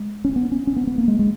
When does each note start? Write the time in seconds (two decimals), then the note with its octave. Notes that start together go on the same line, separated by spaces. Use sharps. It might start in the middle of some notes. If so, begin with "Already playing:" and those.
Already playing: G#3
0.25 C#4
0.36 B3
0.52 C#4
0.67 C#4
0.76 B3
0.87 B3
0.98 A#3
1.08 G#3
1.19 G#3